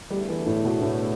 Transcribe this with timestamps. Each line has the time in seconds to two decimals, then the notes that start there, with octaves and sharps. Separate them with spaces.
0.10 E2 D3 G3 A3
0.28 E3
0.46 A2
0.64 B2
0.82 A2